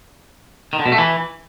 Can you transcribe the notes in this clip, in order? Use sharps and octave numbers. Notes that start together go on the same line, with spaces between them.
D#3
D3
B2
A3
E3